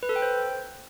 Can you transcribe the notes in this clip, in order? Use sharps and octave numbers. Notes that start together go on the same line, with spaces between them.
B4
A4
G5
C5